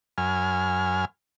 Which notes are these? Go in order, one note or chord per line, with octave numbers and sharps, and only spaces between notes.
F#2 G#5 F6